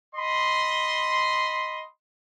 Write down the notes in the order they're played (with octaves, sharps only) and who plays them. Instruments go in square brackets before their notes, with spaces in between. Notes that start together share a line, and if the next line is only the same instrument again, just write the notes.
[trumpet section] D#5 B5 C6